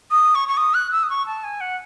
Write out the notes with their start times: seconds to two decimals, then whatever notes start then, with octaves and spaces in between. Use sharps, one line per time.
0.11 D#6
0.35 C#6
0.48 C#6
0.57 D#6
0.74 F#6
0.92 E6
1.03 D#6
1.10 C#6
1.27 A5
1.44 G#5
1.61 F#5